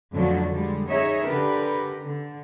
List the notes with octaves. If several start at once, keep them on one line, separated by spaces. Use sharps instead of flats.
F2 A2 D3 F3 F#3 D4
D3 G3 G#3
D#4 G#4 C#5 D#5 E5
D3 G4 A#4 B4
D3